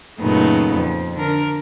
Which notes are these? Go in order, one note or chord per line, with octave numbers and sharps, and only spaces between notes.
F#2 A#2 C#3 A3 B3 D#4
F2
D3 A#4